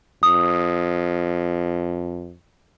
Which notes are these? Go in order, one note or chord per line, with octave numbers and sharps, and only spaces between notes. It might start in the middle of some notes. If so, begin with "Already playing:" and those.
F2 D#6